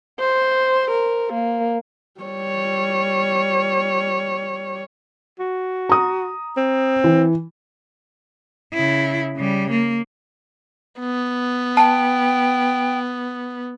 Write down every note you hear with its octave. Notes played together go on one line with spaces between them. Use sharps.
C5
A#4
A#3
G3 C#5
F#4
A#5 D#6
C4
E3
C#3 E4
C#3 G3
A#3
B3
G5 A5